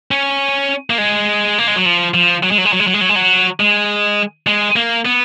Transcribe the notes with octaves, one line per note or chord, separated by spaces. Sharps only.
C#4
A#3
G#3
A#3
G#3
F#3
F3
F3
F#3
G#3
F#3
G#3
F#3
G#3
F#3
G#3
F#3
G#3
F#3
G#3
G#3
A#3
B3